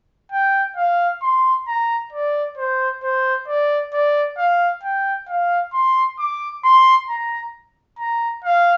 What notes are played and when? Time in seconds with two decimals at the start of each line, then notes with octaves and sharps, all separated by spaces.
0.32 G5
0.77 F5
1.22 C6
1.67 A#5
2.12 D5
2.58 C5
3.03 C5
3.48 D5
3.93 D5
4.38 F5
4.83 G5
5.28 F5
5.74 C6
6.19 D6
6.64 C6
7.09 A#5
7.99 A#5
8.44 F5